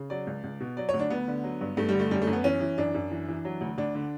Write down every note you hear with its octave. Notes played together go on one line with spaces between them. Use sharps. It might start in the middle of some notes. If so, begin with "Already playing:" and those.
Already playing: C#3
F#3 D5
C#2
C#2
B2
F#3 D5
C#5
D2
D4
D2 B3
D3
F#3
G2
G2 A3
G3
D3
A3
F#2 G3
A3
F#2
B3
E3 C#4
E3
F#2 D4
F#2
E3
E3
F#3
D2
D2 D4
D3